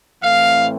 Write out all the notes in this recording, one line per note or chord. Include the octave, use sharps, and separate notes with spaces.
A2 E3 A3 C4 F5